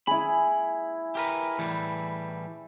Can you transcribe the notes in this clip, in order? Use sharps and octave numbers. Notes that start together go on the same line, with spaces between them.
E4 G#4 B5
G4 A#4 B4
A2 E3 G3